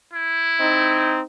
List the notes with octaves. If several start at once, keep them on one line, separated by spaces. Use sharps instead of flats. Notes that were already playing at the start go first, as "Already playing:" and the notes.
E4
C4 D#4